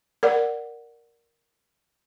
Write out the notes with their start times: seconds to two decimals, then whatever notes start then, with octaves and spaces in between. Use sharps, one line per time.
0.23 A#4 D5 F#5